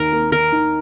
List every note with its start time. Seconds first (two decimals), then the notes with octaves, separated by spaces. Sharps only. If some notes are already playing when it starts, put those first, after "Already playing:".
Already playing: D#2 A#4
0.12 A#3
0.32 D#3 A#4
0.52 D#3